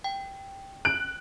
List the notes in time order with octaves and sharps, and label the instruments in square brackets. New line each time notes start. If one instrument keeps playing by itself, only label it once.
[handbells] G5
[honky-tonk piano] F#6 [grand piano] D7